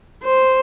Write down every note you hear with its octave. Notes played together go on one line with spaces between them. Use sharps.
C5